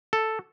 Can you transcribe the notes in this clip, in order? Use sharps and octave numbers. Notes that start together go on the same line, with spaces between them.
A4